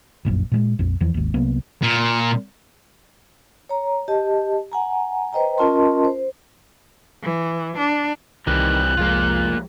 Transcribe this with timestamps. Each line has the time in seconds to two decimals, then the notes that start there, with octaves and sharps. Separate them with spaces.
0.25 F1 A#1 F#2
0.52 A#2 F#3 G#3
0.79 A#1 F2
1.01 E2 E3 F3
1.14 G#1 D#2
1.34 C2 F#3 A#3 B3
1.82 A#2
3.69 C#5 A#5
4.08 G4 D#5 A5
4.72 F#5 G#5 A#5
5.33 B4 C5 D#5 G5 A#5
5.58 C#4 F4 A#4 D#5 A5 C6
6.05 C5
7.24 E3
7.77 D4
8.47 C2 D#3 E3 G3 C4 F#6
8.97 F1 F3 G#3 A#3 F4